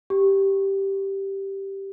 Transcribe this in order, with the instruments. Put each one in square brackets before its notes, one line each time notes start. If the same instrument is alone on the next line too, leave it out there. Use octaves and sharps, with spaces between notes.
[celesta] G4